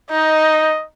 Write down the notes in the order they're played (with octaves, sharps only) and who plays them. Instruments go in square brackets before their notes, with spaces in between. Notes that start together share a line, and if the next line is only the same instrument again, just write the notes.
[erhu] D#4 [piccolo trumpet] D#5